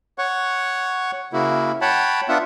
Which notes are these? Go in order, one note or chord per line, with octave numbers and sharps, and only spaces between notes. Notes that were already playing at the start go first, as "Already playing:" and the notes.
C#5 F#5 C#6
C#3 A#3 E4 F#4
C#5 F#5 G5 A5 B5
B3 D4 F4 E5 F#5